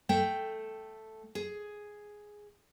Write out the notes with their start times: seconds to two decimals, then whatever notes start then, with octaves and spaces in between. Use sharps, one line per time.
0.09 A3 G5
1.35 G#4